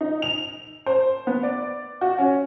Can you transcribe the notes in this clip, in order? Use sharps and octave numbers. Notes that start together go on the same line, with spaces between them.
D#4
F7
C5
B3
D5
F#4
C#4